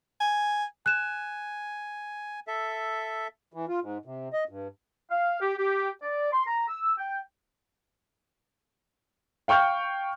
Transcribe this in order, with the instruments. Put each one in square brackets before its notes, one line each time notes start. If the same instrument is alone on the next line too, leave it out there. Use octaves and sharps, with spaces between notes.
[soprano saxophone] G#5
[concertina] G#5 [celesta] F#6 E7
[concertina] A4 E5
[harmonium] E3
F4
G#2
C3
D#5
G2
[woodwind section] F5
G4
G4
D5
C6
A#5
E6
G5
[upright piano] F5 G5 C#6 F6 G6